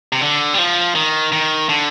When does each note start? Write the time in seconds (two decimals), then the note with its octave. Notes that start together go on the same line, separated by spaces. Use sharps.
0.13 C3
0.21 D3
0.54 G3
0.58 F3
0.95 D#3
1.32 D#3
1.69 D3